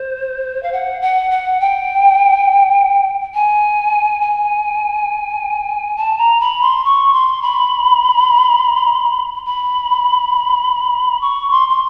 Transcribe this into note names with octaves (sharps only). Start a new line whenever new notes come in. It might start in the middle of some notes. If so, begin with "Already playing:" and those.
Already playing: C5
F5
F#5
F#5
F#5
G5
G#5
G#5
A5
A#5
B5
C6
C#6
C6
B5
B5
C#6
C6
C6